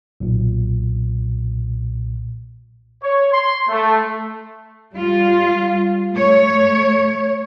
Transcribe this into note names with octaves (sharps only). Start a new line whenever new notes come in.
B1 A#2
C#5
C6
A3
G3 F4
A3 C#5